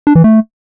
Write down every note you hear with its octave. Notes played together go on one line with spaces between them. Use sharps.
D4
E3
A3